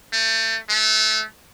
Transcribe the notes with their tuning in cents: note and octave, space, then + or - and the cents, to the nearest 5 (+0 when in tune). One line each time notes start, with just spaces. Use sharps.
A3 +30
A3 -20